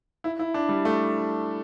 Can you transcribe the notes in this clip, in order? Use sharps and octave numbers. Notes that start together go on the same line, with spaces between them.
E4
E4
D4
G3
A3